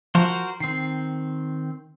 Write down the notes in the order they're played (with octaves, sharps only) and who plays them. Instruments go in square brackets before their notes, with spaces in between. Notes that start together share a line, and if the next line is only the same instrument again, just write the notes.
[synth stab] F3 [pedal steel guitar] F#4 A#4 C5
[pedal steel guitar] D#3 C4 [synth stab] C7